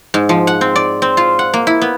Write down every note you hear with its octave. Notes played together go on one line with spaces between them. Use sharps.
G#2
F3
F#5
C4
D5
C4
F4
F#5
A#3
E4
B3